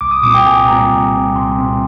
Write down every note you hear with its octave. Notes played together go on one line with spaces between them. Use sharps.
C2 D6
D#6
A#2 G3 C4 D6
G5
C2 G#5
A#2 G3 C4 A#5
C2
A#2 G3 C4
C2 C6
A#2 G3 C4